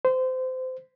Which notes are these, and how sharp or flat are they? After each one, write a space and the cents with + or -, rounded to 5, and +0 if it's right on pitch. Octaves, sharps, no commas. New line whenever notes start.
C5 -25